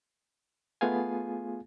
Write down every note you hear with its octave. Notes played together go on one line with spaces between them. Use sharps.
A3 B3 F4 G#4 F5 G#5